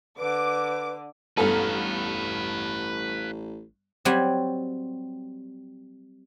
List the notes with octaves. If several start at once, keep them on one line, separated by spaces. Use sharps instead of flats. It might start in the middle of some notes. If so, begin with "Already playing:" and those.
D3 B4 D6
A1 G2 B3 A4 B4 F5 A#5
F#3 G3 C4 G4 F#5 G#5